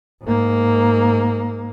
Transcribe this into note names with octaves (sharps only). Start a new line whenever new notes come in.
G#2 A#3